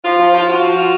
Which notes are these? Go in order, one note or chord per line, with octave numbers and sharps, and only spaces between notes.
F3 F4
F3
F3 F4
F4 F#4
F3
F4